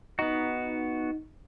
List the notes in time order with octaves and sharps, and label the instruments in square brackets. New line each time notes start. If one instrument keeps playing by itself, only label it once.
[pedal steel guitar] B3 F#4 [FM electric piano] D#4